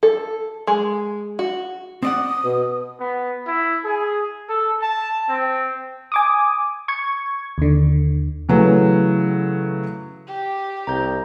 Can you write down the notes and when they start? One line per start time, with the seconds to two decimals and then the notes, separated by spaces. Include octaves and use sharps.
0.03 A4
0.67 G#3
1.39 F#4
2.03 C4 D5 F#5 D#6
2.44 B2
2.99 B3
3.46 E4
3.84 G#4
4.48 A4
4.82 A5
5.29 C4
6.12 G#5 D6 D#6
6.88 C#6 G#6
7.58 D#2 D3
8.49 C#3 E3 F#3 A3 B3
10.28 G4
10.87 C2 A#5 G6